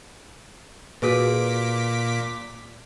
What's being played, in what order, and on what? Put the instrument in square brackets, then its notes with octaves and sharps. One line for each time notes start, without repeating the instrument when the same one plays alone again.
[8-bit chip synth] A#2 D6 B6 [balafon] F#4 G#4 B4